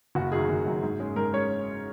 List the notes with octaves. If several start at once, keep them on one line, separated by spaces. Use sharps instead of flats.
F#1 F#4
F#2 D#3 F#3 G#4
F#1
F#2 D#3 F#3
G#2
G#3 C#4
G#2 A#4
G#3 C#4 C#5